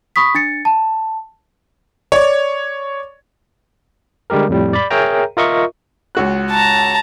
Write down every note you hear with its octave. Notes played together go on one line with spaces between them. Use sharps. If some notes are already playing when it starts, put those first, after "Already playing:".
B5 C#6 D#6 B6
D4 A6 C#7
A5
C#5 D5
D3 G3 G#3 G4 A#4
F2 A2 G3
D5 B5
G#4 A#4 C#5 E5 G5 A#5
F4 A#4 D#5 E5 C#6
C#2 F#4 F#6
A5 A#5